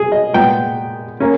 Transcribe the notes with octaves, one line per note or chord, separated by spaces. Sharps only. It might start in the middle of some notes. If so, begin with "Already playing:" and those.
Already playing: G#4
D#5
A#2 G#3 B3 G5
A#3 C#4